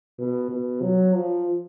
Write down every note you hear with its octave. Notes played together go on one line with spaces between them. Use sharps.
B2
B2
F#3
F3